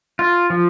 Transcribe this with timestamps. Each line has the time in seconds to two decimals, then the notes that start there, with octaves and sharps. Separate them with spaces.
0.19 F4
0.50 F3